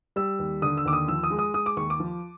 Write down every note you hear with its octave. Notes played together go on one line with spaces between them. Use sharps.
G3 E6
D#2
D3 D#6
E6
D#2 D6
D#6
F3 E6
D#6
G#3
D#6
G#3 D#6
D6
D#2 C#6
D6
F3